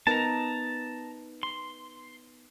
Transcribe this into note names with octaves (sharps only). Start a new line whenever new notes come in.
B3 D#4 A#4 A5 A#5
C6